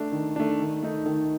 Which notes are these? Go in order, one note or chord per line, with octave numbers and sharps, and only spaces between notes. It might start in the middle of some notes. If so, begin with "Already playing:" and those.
Already playing: A3 D4
D#3
A3 D4
D#3
A3 D#4
D#3